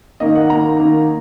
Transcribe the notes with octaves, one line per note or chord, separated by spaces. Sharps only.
D#3 A#3 D#4 D#5
F#5
D#3 A#3 D#4 A#5
D#3 A#3 D#4